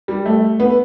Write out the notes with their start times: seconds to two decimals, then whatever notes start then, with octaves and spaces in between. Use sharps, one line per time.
0.08 G3
0.26 A3
0.60 B3